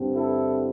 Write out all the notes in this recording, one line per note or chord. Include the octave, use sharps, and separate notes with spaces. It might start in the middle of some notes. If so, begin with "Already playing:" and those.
Already playing: G2 D3 C4
E4 A4